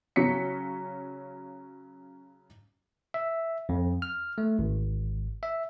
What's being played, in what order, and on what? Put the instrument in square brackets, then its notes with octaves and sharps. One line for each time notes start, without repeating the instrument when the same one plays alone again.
[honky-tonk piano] C#3 F#3 C#4 B6 C#7
[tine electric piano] E5
F2
F6
A3
G#1
E5